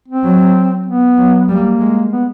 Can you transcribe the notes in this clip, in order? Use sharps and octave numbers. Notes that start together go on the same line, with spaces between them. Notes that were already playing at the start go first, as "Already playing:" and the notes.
C4
F#3
B3
F#3
G3 A#3
G#3
B3